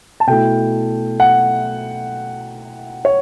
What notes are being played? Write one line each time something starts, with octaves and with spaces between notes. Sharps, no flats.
A5
B2 A3 E4 G5
F#5
C#5